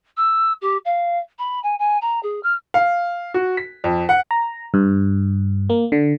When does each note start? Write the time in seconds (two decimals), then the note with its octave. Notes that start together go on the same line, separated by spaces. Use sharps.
0.17 E6
0.61 G4
0.85 F5
1.38 B5
1.63 G#5
1.78 G#5
2.01 A#5
2.22 G#4
2.43 F6
2.74 F5
3.34 F#4
3.57 B6
3.84 F2
4.09 F#5
4.31 A#5
4.74 G2
5.70 A#3
5.92 D3